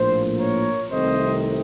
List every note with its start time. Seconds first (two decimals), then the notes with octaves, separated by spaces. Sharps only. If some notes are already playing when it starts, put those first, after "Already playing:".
Already playing: A#1 A2 F3 A#3 C5
0.40 A#4 C#5
0.90 C2 C3 D#3 A3 C4 C5 D#5